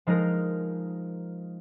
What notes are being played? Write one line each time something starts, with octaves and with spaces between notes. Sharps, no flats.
F3 G#3 D#4 A#4